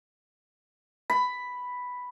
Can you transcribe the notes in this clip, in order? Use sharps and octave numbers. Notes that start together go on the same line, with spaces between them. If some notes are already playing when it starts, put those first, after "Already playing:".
B5